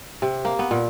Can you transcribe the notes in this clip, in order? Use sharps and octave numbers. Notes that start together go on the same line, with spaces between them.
C3
A#3
B3
A#2